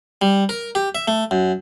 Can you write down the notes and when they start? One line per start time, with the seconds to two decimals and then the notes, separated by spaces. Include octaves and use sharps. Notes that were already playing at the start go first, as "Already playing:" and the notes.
0.22 G3
0.49 A#4
0.75 G4
0.95 E5
1.08 A3
1.31 F#2